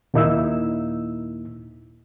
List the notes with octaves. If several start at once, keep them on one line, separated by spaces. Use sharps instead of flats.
D#2 A#2 A#3 D#4 E4 E6